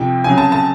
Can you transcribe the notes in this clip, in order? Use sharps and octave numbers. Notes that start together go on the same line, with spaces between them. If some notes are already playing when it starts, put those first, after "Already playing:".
Already playing: F2 C3 F3 G5
F2 C#3 F#3 G#5
A5
A5